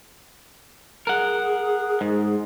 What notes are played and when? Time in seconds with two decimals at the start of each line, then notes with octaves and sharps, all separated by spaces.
1.07 G#4 A#4 F#5
2.01 G#2